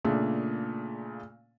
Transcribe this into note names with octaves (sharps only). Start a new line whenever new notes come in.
A#2 C#3 A3 D4